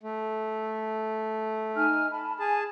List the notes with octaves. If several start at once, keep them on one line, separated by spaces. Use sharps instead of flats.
A3
D#4 G#5 F6
A5 B5
G#4 G#5 A5